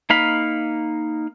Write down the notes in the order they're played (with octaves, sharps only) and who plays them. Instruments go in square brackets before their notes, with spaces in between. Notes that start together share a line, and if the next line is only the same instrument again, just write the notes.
[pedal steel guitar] A#3 D#4 F5 B5